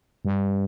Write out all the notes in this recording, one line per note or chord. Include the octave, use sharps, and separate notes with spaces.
G2